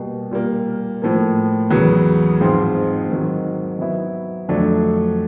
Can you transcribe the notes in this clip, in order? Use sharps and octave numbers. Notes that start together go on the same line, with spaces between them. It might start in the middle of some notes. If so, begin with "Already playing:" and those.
Already playing: B2 G3 A#3
A#2 G3 A#3
A2 F3 A#3
E2 C#3 F#3 B3
G#2 F3 G#3 C4 F4
G#2 D#3 F#3
F#3 B3 E4
F2 D3 F#3 A3 D4